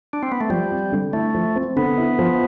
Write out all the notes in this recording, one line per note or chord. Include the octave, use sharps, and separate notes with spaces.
D4
C4
B3
A3
F3 G3
C4
D3
A3 E4
F3
C4
D3 B3
E4
F3